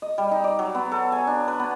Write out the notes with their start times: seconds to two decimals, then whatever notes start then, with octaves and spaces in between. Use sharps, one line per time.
0.02 D#5
0.18 G3
0.31 D#4
0.44 D5
0.59 F#3
0.75 B3
0.92 A4
1.12 G#5
1.27 D4
1.48 B4
1.60 B3